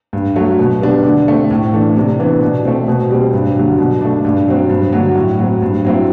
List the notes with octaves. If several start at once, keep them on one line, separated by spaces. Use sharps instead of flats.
G2
F#3 A3
B2
G3 B3 D4
D3
A3 C4
A2
E3 A3 D4
C3
E3 B3 D4
B2
A3 C4
B2
G3 C4
G2
D3 F#3
B2
A3 D4
G2
F#3 C4
G2
D3 F#3
A2
F#3 C4
G2
F#3 C4 E4